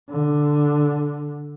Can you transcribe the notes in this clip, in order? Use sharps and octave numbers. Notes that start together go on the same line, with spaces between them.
D3